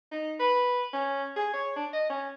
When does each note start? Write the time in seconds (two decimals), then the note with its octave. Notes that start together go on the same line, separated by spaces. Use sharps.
0.11 D#4
0.39 B4
0.93 C#4
1.36 G#4
1.53 C#5
1.76 D4
1.93 D#5
2.10 C#4